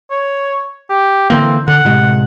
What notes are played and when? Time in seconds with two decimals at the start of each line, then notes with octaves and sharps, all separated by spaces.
0.11 C#5
0.90 G4
1.30 D3 E3 A#3 C4
1.68 D3 F#5
1.85 A2 C3 G#3